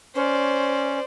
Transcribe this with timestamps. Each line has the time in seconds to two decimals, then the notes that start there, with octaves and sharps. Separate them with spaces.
0.15 C#4 C5 D5